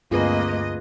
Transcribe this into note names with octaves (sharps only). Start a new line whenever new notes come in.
D2 G2 A#3 C4 F4 G#4 B4 D#5